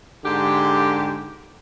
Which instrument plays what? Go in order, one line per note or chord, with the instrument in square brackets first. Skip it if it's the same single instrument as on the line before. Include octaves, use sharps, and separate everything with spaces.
[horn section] G#2 D3 G4